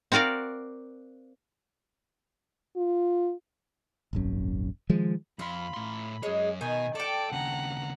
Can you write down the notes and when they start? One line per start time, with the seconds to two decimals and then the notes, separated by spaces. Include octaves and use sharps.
0.12 C4 F#4 A#4 D5 F5
2.77 F4
4.13 D#1 G#1 F#2
4.89 D#3 F3 G#3
5.39 F2 F4 B5 C6
5.74 A2 C6
6.23 F#2 G#3 C#5
6.61 B2 D#3 G#5
6.95 A4 D5 G5 A5 D7
7.32 D#2 C#3 F#5 A#5